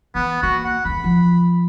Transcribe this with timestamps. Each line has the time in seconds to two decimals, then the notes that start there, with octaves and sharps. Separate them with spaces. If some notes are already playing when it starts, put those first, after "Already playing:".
0.15 E3 B3
0.43 A#3 F#4
0.64 F#5
0.85 F1 E2 B5
1.04 F3